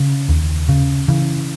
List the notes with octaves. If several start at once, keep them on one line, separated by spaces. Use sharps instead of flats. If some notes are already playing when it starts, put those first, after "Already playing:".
Already playing: C#3
D#2
C#3
C#3 E3